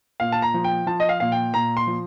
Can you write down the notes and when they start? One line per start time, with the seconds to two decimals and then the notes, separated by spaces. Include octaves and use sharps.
0.20 A#2 F5
0.32 A5
0.42 A#5
0.54 F3
0.64 G5
0.86 F3 A5
1.00 D#5
1.09 F5
1.20 A#2 F5
1.32 G5
1.54 A#2 A#5
1.77 C6
1.87 F3